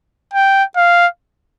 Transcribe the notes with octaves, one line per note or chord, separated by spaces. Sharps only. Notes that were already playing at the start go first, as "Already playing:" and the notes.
G5
F5